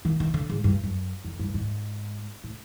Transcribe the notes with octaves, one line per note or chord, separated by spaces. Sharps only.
D#3
D#3
D3
G#2
G2
F#2
F2
G2
G#2
A2